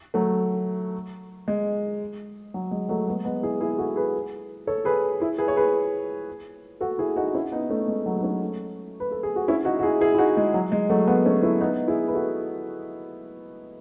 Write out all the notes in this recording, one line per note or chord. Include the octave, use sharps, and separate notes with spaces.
F#3 A3
G#3
F#3
G#3
F#3 A3
G#3 B3
G#3 B3
E4 G#4
E4 G#4
F#4 A4
G#4 B4
A4 C#5
G#4 B4
E4 G#4
G#4 B4
C#5
G#4 B4
F#4 A4
E4 G#4
D#4 F#4
C#4 E4
B3 D#4
A3 C#4
G#3
F#3 A3
D#4
A3 C#4
B4
A4
G#4
F#4
C#4 E4
D#4 F#4
F#4
E4 G#4
E4 G#4
E4
D#4 F#4
G#3
F#3
G#3
F#3 A3
G#3 B3
A3 C#4
C#4 E4
B3 D#4
E4 G#4
B4
F#4 A4